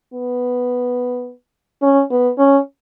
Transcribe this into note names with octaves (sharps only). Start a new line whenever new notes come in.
B3
C#4
B3
C#4